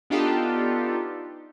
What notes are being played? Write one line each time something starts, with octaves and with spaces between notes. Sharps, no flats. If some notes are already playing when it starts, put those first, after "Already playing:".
B3 D4 D#4 F4 G4 A4